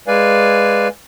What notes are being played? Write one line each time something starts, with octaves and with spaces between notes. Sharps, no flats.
G#3 B4 D5 F5 G#5